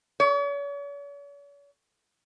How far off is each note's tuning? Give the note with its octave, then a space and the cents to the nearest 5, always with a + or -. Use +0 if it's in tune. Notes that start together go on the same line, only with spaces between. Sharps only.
C#5 +45